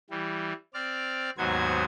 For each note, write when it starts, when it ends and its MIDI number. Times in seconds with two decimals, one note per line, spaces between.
0.10 0.53 52
0.10 0.53 55
0.74 1.30 60
0.74 1.30 74
0.74 1.30 89
1.38 1.84 39
1.38 1.84 44
1.38 1.84 54
1.38 1.84 59
1.38 1.84 72
1.38 1.84 92